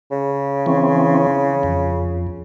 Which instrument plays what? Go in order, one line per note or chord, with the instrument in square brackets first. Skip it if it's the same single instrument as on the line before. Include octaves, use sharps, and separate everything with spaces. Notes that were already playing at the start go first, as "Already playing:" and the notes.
[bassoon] C#3
[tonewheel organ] E3 C4 C#4
F2